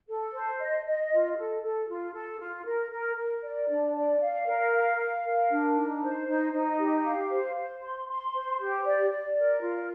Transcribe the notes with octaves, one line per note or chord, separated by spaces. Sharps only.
A4
C5
D#5
D#5
F4
A4
A4
F4
A4
F4
A#4
A#4
A#4
D5
D4
D5
F5
A#4
F5
F5
A#4
D4
D#4
C5
D#4
D#4
G4
F5
C5
C5
C6
C6
C5
G4
D5
D5
A#4
F4